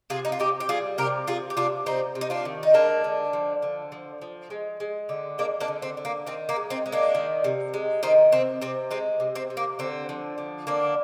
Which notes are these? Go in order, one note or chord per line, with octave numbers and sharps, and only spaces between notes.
C3 F4 G#4
D#4
F4
C3 D#4 G4
G4
G3 F4 G#4
C3 G4 A#4
C3 F4 G#4
G4
C3 D4 F4
C3 C4 D#4
C3
D#4
D4 F4
D#3
D#4
G#3 A#3 D4
D3
F3
D3
F3
F3
G#3
G#3
D3
G#3 A#3 D4
A#3 D4
D3
C4
D3
A#3
D#3 C4
A#3
G#3
C4 D#4
G#3
A#3 D4
D#3
C3
G#3
D#3 C4 D#4
C3 C4
C3 C4
G#3 C4
C3
C4
C3
A#3
D3 C4
F3
D3
D3 A#3 D4